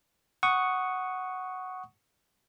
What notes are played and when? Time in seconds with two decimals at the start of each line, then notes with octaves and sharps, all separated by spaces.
0.43 F#5 C#6 D#6